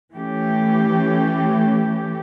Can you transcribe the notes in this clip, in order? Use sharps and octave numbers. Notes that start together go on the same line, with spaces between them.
E3 A3 C#4 G4